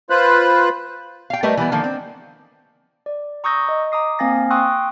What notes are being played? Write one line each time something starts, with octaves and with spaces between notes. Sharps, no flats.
F4 B4 C5 B5 F#6
F5 G5
G3 A3 A#4 B4 D#5 E5
E3 G3 B3
D3 D#3 F3 A#3
C4
D5
A#5 C#6 D#6 E6 G6 A#6
D#5
A#5 D6 D#6 C7
A#3 C4 F5 G#5 A6 A#6
G5 C6 C#6 D#6 E6 F#6